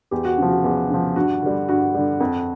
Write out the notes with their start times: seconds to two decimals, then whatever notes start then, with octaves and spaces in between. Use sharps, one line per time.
0.11 E2 G4
0.25 F#4
0.38 C#3 F3
0.50 F#4
0.64 E2
0.90 C#3 F3
1.16 G2 F#4
1.42 D3 G3
1.69 G2 F#4
1.95 D3 G3
2.20 F2